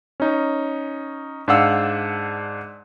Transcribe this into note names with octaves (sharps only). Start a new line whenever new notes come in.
C#4 D#4
G#2 D4 F5 F#5 E6